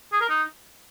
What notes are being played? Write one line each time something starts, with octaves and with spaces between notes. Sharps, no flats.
G#4
A#4
D#4